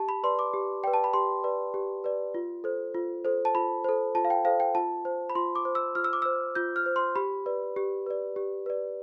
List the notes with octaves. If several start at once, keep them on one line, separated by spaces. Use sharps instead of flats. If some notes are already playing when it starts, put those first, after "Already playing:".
Already playing: G4 A5
B5
B4 D5 C6
D6
G4
B4 D5 G5
A5
B5
G4 C6
B4 D5
G4
B4 D5
F4
A4 C5
F4
A4 C5
A5
F4 B5
A4 C5
F4 A5
F5
G5
A4 C5 F5
G5
F4 A5
C5
B5
F4 C6
D6
C5
E6
F4 F6
E6
D6
C5 E6
F4 G6
F6
C5
C6
G4 B5
B4 D5
G4
B4 D5
G4
B4 D5